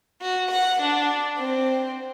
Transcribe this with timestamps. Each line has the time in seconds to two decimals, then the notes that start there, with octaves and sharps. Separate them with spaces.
0.22 F#4
0.51 F#5
0.81 D4
1.38 C4